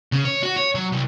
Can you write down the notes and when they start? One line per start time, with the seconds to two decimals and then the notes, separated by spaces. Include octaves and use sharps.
0.12 C#3
0.25 C#5
0.43 F#4
0.56 C#5
0.75 F#3
0.92 C2